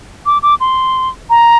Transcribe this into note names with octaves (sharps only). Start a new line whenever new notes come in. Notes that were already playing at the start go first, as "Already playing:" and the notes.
D6
D6
C6
A#5